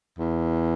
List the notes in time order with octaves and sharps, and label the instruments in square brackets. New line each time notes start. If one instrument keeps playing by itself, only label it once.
[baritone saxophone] E2